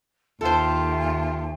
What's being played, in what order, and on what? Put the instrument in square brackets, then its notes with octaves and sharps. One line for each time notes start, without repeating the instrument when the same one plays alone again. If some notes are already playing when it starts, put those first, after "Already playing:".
[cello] D#2 [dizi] F4 [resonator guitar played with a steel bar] A4 C5 [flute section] E5 G5 A5